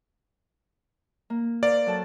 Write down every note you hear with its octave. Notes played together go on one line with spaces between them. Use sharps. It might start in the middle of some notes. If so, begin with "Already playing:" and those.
A#3
A#4 C5 D5 F5
F#3 A4 A5